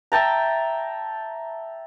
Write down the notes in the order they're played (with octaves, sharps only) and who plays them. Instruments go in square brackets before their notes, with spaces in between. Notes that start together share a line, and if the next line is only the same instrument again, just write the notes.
[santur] E5 G5 A5 A#5